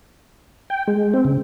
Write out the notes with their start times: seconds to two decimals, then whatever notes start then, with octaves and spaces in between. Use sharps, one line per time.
0.70 G5
0.88 G#3
1.14 C4
1.25 C#3